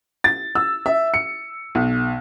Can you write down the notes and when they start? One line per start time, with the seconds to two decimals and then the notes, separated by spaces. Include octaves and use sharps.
0.24 A6
0.55 E6
0.86 E5
1.14 C#7
1.75 B1